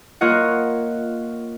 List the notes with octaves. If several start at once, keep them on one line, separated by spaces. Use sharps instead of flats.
A#3 F4 C#5 D#5 F#5